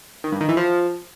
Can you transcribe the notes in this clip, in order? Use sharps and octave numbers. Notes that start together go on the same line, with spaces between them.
D#3
G2
D#3
E3
F3